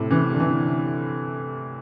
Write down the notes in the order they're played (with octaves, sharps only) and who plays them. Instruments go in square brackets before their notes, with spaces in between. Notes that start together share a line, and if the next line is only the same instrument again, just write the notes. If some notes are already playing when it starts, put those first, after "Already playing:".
Already playing: [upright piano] A2 C3
C3 E3
D3
C3 E3